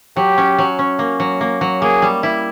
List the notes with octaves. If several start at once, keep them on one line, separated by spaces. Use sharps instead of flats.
F#3 G4
C#4
F#3
C#4
A#3
F#3
A#3
F#3
A#3 G#4
G3
E4